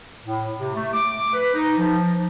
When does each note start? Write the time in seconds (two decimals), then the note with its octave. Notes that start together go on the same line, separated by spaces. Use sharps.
0.23 A2
0.58 C3
0.74 A3
0.93 D6
1.33 B4
1.54 D#4
1.78 F3